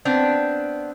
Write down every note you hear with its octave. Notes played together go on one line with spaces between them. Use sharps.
B3 C4 D4